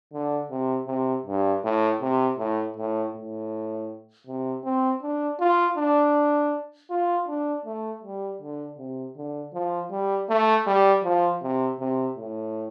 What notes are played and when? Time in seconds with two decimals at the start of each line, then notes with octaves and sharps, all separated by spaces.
0.13 D3
0.51 C3
0.88 C3
1.26 G2
1.64 A2
2.01 C3
2.38 A2
2.77 A2
3.15 A2
4.27 C3
4.64 C4
5.02 D4
5.40 F4
5.77 D4
6.90 F4
7.27 D4
7.66 A3
8.04 G3
8.42 D3
8.78 C3
9.17 D3
9.54 F3
9.91 G3
10.30 A3
10.67 G3
11.04 F3
11.42 C3
11.80 C3
12.17 A2